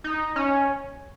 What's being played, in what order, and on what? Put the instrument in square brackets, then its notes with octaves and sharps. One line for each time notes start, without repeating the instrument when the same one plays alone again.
[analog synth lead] D#4
C#4